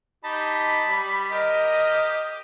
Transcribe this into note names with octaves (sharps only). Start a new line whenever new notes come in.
D#4 G4 A5 B5
G3
G4 A#4 D#5